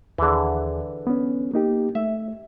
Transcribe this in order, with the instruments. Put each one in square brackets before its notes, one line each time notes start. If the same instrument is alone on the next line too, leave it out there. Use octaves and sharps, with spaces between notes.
[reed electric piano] D#2 G#4 [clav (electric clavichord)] D3 E3
[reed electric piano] B3 C#4
A#3 D#4 G4
[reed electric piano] A3 [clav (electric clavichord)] E5